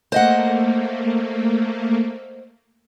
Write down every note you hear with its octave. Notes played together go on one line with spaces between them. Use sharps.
A3 A#3 C5 D#5 F#5